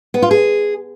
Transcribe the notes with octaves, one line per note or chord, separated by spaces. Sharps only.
B3
F4
G#4